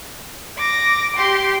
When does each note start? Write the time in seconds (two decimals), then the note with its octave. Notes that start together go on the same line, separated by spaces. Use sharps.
0.58 D6 A#6
1.16 G4 C6